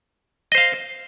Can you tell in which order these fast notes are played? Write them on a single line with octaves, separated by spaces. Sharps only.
D#5 C5 F5